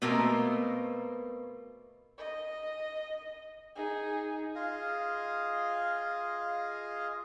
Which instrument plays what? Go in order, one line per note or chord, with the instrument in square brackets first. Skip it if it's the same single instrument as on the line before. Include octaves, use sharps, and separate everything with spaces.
[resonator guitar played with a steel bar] B2 A3 A#3 C4 A#4
[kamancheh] D#5
D#4 G#4
[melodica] F4 G#4 D#5 F5